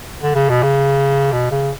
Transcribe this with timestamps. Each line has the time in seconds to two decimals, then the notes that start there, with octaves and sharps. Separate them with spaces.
0.22 D3
0.35 C#3
0.50 B2
0.63 C#3
1.32 B2
1.51 C#3